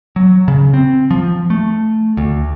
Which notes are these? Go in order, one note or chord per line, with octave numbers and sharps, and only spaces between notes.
F#3
C#3
C4
F3
A3
D2